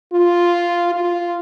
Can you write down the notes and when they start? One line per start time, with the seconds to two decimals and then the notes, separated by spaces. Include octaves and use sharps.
0.13 F4
0.94 F4